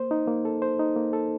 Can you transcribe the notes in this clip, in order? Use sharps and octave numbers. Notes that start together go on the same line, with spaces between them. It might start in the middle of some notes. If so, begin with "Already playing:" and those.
Already playing: A#3 C5
D#4
A#3
A4
C5
D#4
A#3
A4